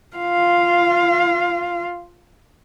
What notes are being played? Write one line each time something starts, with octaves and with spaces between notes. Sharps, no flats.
F4 F5